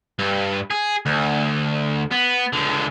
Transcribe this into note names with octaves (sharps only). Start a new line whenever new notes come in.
G2
G#4
D2
B3
C#2 D3